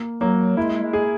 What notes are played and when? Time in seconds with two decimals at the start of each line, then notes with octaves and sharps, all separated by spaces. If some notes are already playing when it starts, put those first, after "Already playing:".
Already playing: A#3
0.21 F#3 A#3
0.57 G#3 E4
0.82 G#3
0.93 G#4